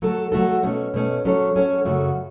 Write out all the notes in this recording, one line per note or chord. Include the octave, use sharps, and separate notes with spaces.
F#3 A3 F#4 A4
F#3 A3 F#4 A4
B2 A3 C#4
B2 A3 C#4
F#3 C#4 A4 C#5
F#3 C#4 A4 C#5
F#2 C#3 A3 F#4